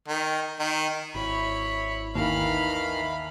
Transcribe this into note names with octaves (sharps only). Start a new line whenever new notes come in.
D#3
D#3
G#1 E4 C#5 B5
D#2 D#3 E3 F5 A#5 B5